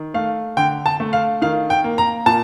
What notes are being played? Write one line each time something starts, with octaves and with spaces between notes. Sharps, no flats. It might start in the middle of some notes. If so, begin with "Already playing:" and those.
Already playing: D#3
A3 F5
D3 G5
A5
A3
F5
D#3 F5
G5
A#3
A#5
A#2 A5